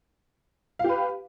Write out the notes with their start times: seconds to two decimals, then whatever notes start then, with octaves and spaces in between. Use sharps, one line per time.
0.79 F5
0.84 G4
0.89 B4